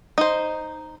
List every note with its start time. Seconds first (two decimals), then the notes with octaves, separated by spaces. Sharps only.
0.18 D#4 C5